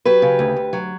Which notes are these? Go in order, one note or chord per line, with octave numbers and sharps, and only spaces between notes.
F#3 G4 B4
C#3
D2
D2
F#3